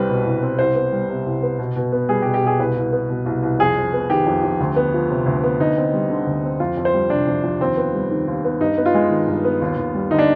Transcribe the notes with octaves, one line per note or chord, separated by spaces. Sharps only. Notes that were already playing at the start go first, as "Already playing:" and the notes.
Already playing: C2 G3 C4 B4
B2
C2
C4
C2 C5
B3
G3
C3
C2
B3
B2
B2
B3
G3 G#4
G4
B2
G4
B2 G#4
C2 B4
C2
B3
B2
C2
C2
F2 G#4
F2
B3
D#3 G4
F2
F2
D2
B3
F3
C3
D2
B3
D2 D#4
C4
G3
D3
D2
C4
F2 F4
F2
C5
G3
C3 D4
F2
F2
D#2 C4
B3
G3
D#3
D#2
B3
G2 D#4
B3
F4
G#3
D#3
G2
B3
D#2
D#2
G3
D3 D#4
D4